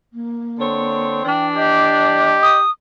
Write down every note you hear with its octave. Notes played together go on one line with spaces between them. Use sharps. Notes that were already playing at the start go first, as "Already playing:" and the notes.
A#3
D3 C4 C#5
E3 D4 G5
G4 D#5
D#6